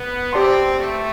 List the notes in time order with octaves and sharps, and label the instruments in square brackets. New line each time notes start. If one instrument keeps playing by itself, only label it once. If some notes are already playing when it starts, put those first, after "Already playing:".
Already playing: [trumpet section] B3
[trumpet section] C4 [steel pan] G4 D5 A5 C6
[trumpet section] A3